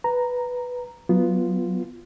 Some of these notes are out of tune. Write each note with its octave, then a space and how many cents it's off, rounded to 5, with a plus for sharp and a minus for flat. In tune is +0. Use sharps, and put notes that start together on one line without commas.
B4 +0 A#5 +0
F#3 +0 B3 +0 F4 -10